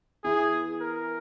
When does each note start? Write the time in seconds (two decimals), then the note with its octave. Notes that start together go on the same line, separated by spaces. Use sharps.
0.24 E3 B3 E4 G#4
0.80 A#4